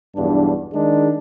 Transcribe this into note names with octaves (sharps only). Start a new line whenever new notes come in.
B1 E2 G2 D4
D#3 G#3 D4 G#4